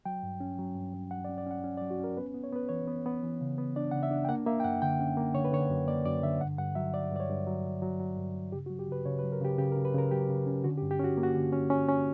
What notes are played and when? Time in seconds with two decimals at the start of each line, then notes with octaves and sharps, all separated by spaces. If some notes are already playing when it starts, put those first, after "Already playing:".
0.05 F#3 G5
0.23 G2
0.40 C#4
0.58 F#3
0.76 G2
0.93 F#3
1.11 F#3 F#5
1.25 D5
1.29 C#4
1.38 D5
1.46 C#4 F#5
1.64 C#4
1.77 D5
1.81 F#3
1.91 F#4
2.00 C#4 A#4
2.17 B3 B4
2.34 B3
2.44 C#5
2.53 B3 B4
2.69 E3 C#5
2.88 B3
3.06 B3
3.23 E3
3.41 C#3
3.58 B3
3.76 D4 D5
3.91 C#3 F#5
4.03 E5
4.11 D4
4.25 G5
4.29 A#3 F#5
4.47 A#3 E5
4.60 G5
4.64 F#2 F#5
4.82 D3 G5
5.00 C#4
5.17 A#3
5.35 D3 C#5
5.45 B4
5.52 D3 C#5
5.70 F#2
5.88 A#3 D5
6.05 F#2 D5
6.23 D3 E5
6.41 G2 F#5
6.58 G2 F#5
6.75 F#3 E5
6.94 F#3 D5
7.11 G2 D5
7.20 C#5
7.29 G2
7.47 F#3
7.64 F#3
7.82 F#3
8.00 F#3
8.17 G2
8.35 G2
8.52 C#3 G4
8.66 F#4
8.70 F#3
8.79 G4
8.88 C#3 B4
9.05 C#3 C#5
9.19 B4
9.24 F#3
9.32 A#4
9.41 C#3 G4
9.58 C#3 G4
9.72 A#4
9.76 C#3
9.85 B4
9.94 C#3 A#4
10.11 F#3 G4
10.29 C#3
10.47 C#4
10.64 D3 F#4
10.78 G4
10.82 G2
10.91 G4
11.00 C#4 F#4
11.17 A#3
11.23 F#4
11.35 D3
11.53 C#4
11.70 C#4
11.88 C#4